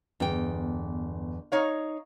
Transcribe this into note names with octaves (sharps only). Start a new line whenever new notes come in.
G1 E2 G5
D#4 C#5 F5